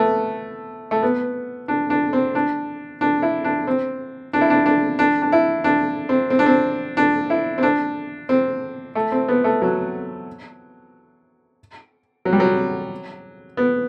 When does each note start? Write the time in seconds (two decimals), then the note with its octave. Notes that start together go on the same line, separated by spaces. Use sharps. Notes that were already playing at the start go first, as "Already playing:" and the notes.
Already playing: A3 B3
0.91 A3
1.02 B3
1.68 D4
1.90 D4
2.13 C4
2.35 D4
3.01 D4
3.22 E4
3.44 D4
3.67 C4
4.33 D4
4.41 E4
4.50 D4
4.66 D4
4.99 D4
5.22 D4
5.32 E4
5.64 D4
6.09 C4
6.30 C4
6.39 D4
6.46 C4
6.97 D4
7.30 E4
7.58 C4
7.63 D4
8.29 C4
8.95 A3
9.12 C4
9.28 B3
9.44 A3
9.62 F#3
12.25 F#3
12.33 G3
12.40 F#3
13.57 B3